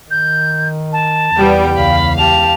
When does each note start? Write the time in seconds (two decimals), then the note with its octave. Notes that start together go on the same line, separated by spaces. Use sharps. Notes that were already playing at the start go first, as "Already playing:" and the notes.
0.11 D#3 G6
0.93 A5
1.37 E2 C3 G3 B3 G5
1.74 C#2 F5 B5
2.18 G4 A5 F7